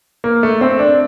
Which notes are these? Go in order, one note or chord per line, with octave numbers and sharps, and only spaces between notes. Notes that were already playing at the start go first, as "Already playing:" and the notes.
A#3
A3
C4
D4